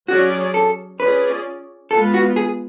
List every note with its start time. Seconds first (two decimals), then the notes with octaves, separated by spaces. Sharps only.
0.08 F#3 C#4 F#4 G#4 D5
0.54 A4
1.00 C#4 F4 G#4 B4 D5
1.91 G#3 B3 F4 A4 B4
2.14 F#4
2.36 G#4